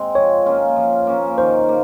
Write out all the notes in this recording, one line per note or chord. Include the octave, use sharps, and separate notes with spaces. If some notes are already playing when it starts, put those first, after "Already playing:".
Already playing: G#3 C4
F3 C#5
A#3 C#4 F4
F3
A#3 C#4 F4
D#3 C5
A#3